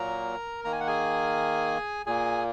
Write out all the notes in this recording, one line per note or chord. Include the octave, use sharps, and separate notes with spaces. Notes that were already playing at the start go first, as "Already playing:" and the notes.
Already playing: A#2 F#3 A#3 A#4 A#5
D#3 A#3 A#5
G#5
F#5
G#4 G#5
A#2 A#3 G#4 G#5